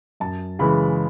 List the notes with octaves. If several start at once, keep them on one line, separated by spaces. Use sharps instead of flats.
F#2 A5
C#3 E3 G#3 B5